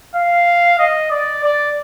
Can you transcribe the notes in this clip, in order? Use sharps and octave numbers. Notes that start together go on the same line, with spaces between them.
F5
D#5
D5
D5